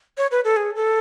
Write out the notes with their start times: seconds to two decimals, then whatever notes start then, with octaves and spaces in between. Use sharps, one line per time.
0.18 C#5
0.31 B4
0.45 A4
0.57 G#4
0.76 A4